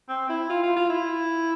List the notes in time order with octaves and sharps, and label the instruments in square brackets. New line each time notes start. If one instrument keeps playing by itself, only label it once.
[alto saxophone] C4
E4
F4
F4
F4
E4